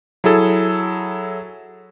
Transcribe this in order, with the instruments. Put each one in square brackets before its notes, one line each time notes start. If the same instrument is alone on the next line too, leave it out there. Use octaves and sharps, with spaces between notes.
[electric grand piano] F#3 E4 G#4 A4